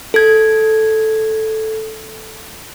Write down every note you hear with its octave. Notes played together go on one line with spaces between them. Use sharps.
A4 G#6